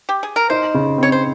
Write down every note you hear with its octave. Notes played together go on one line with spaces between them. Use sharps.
G4
G#4
A#4
D#4 C5
C#3
C4 C#5
C5